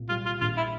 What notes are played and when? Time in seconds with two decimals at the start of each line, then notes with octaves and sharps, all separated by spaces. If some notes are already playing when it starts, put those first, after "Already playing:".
Already playing: C2 A#2
0.09 G3 F4
0.26 F4
0.41 A#1 F4
0.57 E4